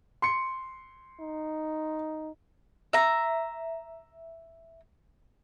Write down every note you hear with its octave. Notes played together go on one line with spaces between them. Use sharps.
C6 C#7
D#4
E5 A#5